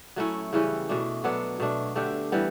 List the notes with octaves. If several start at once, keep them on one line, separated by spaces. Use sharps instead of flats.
F#3 A3 C#4 E4
C#3 E3 G3 C#4
B2 A3 D4
F#3 B3 D4 A4
B2 A3 D4
D3 A3 D4 G4
E3 G3 B3